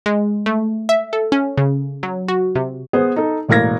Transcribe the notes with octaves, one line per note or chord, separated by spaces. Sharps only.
G#3
A3
E5
A4
C#4
C#3
F#3
F#4
C3
B3 G#4 B4 C5
D#4 A4
E1 A2 A#3 F5 G#6 A#6